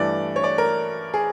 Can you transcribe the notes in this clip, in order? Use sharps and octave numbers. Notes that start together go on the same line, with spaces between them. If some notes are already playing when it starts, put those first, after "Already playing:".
Already playing: G2 E3 A3 D5
C#5
D5
A#4
G#4